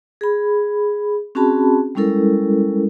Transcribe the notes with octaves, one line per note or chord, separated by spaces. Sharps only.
G#4 B5
C4 C#4 F#4 G#4 A5 B5
G3 G#3 C#4 E4 A4 A#4